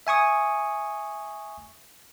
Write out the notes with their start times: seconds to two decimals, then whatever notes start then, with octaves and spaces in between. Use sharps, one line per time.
0.07 E5 G#5 C#6 D#6